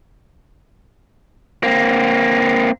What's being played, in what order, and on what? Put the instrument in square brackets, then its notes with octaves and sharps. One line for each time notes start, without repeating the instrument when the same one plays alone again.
[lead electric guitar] A#3 C4